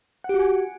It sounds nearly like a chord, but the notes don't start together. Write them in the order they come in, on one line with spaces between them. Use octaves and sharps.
F#5 G4 F#4 G#5